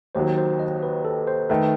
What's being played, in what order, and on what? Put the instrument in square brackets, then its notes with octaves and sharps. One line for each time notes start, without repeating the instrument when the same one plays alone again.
[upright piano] D#2 D#3 F#3 [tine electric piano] C5
[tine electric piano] C5
D#5
B4
A4
C5
[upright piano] D#3 A3 [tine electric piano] B4